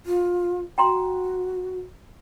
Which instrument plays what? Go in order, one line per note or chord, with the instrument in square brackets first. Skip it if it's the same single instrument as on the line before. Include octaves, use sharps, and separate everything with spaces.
[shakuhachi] F4
[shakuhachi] F#4 [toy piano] G5 A#5 C6